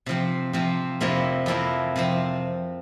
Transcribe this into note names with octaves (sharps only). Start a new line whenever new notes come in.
C3 F3 C4
C3 F3 C4
F2 C3 F3 A#3 E4
F2 C3 F3 A#3 E4
C3 F3 C4